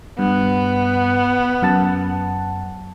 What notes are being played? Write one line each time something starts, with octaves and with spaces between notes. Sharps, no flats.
G2 B3
F#2 F#5 A5